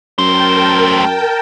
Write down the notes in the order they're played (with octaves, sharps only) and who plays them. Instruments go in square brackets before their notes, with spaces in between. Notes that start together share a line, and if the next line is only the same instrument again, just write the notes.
[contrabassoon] F#2 [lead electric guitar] A3 C5 [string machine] A#4 G5 A5